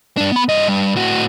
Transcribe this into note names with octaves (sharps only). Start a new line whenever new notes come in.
G2 D4
B3 B5
G2 D#5
G2
A2 F#4